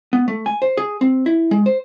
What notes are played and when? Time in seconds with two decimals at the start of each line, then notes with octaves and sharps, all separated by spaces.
0.13 B3
0.28 A3
0.46 G#5
0.62 C5
0.77 G#4
1.01 C4
1.26 E4
1.51 G#3
1.66 C5